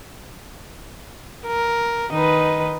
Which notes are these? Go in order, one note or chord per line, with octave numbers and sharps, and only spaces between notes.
A#4
D#3 D#4 B4